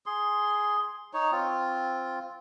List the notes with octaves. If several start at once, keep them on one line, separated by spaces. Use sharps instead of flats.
G#4 C6
D#4 C#5
C4 F4